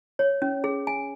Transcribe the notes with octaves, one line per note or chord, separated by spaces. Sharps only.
C#5
C#4
G#4
G#5